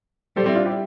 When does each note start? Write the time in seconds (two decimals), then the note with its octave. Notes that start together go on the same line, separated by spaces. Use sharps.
0.36 G3 A4 C5
0.46 C4 E4
0.55 D4 F4
0.66 E4 G4